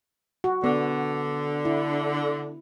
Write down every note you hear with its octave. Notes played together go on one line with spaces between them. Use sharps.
F#4
D3 B3
E4